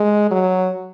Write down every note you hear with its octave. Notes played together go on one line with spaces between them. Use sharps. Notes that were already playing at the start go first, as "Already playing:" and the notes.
Already playing: G#3
F#3